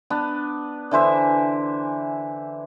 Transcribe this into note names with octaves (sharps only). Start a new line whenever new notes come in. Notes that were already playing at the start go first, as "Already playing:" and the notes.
B3 D4
D3 E3 C5 E5